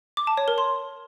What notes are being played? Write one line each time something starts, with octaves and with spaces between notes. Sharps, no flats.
D6
A5
C#5
A#4
C6